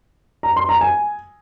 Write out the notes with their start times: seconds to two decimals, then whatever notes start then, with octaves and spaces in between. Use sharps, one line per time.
0.43 A#5
0.56 C6
0.69 A#5
0.81 G#5